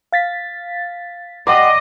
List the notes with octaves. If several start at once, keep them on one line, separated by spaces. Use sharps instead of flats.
F5 A6 B6
G4 D5 D#5 F#5 C6